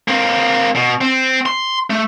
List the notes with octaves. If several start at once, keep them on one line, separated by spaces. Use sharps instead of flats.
A#3 C4
B2
C4
C6
A3